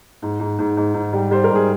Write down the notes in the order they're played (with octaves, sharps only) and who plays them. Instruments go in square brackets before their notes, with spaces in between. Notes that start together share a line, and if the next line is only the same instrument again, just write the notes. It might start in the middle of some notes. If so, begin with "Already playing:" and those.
[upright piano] G#2
G#2
G#2
G#2
G#2
G3
G3 C5
A#4
G#2
G#4